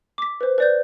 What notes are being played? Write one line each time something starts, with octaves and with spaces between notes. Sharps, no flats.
D6 B6
B4 C5
B4 D5 G6